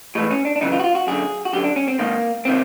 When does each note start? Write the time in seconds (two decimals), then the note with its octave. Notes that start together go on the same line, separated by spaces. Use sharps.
0.15 A2 E3 G#3
0.31 C#4
0.45 D4
0.56 D4
0.61 F#2 C#3 E3 D#4
0.72 F4
0.79 F#4
0.84 F4
0.95 F#4
1.07 F#2 D3 G#4
1.45 F#4
1.53 F#2 D3 G4
1.64 D4
1.76 C#4
1.88 C4
1.99 G#2 D#3 A#3
2.45 C3 D#3 C4